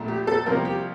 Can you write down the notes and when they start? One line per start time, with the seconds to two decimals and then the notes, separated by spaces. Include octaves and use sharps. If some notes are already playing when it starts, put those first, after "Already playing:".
Already playing: A#1 A#2 A3
0.08 G4
0.27 A4
0.46 C2 C3 F3 A#3 A#4
0.65 G4